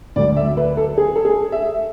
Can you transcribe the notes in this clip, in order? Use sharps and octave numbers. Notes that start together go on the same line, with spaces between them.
D2 D3 F#3 D5
E5
B4
A4
G#4
A4
G#4
E5